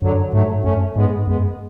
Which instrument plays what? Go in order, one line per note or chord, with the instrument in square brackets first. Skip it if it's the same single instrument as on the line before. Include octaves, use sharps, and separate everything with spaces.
[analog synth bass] F#2 [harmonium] D3 F#3
[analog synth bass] G#2 [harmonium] F#3 A3
[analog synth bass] F#2 [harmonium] A3 C#4
[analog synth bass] G#2 [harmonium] G#3 B3
[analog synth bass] F#2 [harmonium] G#3 B3